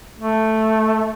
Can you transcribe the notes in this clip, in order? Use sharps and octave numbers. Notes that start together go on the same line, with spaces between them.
A3